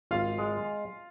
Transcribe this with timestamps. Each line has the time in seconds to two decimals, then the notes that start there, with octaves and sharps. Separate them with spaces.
0.11 G#1 F4 F5
0.38 G#3